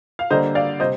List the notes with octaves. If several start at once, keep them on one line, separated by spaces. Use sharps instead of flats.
F5
D3 G3 A#3 C5 D#5
D5 F5
C3 G3 C5 D#5